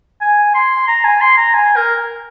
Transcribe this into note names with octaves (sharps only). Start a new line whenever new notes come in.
G#5
C6
A#5
G#5
C6
A#5
G#5
A#4